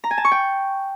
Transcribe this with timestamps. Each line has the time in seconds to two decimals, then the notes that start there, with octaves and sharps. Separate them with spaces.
0.04 A#5
0.11 G#5
0.18 A5
0.25 C#6
0.31 G5